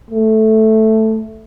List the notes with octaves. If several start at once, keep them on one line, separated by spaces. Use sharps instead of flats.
A3